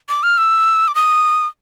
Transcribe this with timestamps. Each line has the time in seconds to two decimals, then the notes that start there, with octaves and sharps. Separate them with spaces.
0.09 D6
0.23 F6
0.38 E6
0.88 D6
0.95 D#6